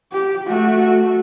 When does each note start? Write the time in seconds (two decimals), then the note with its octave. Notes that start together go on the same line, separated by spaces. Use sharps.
0.12 G4
0.47 A3 F#4